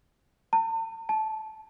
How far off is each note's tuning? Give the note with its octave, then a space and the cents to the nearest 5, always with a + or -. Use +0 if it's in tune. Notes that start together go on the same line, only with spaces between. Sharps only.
A5 +40
A5 -15